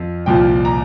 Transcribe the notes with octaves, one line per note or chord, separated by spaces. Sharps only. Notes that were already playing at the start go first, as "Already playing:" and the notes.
Already playing: F2 F3
C2 A#2 F3 G5
A#5